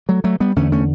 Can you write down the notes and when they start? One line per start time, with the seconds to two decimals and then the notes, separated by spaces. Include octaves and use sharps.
0.09 F#3 A3
0.24 F#3 A3
0.40 G3 B3
0.56 E2 D3 A3 C#4
0.72 A3 C#4